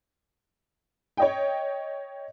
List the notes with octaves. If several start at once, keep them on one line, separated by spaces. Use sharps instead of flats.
C#5 D#5 G5